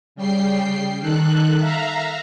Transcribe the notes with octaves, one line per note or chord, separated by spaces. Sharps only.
C#3 G3 G5 C7
D#3 A4 F#6
E5 F5 A#5